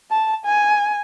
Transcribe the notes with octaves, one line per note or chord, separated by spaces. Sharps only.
A5
G#5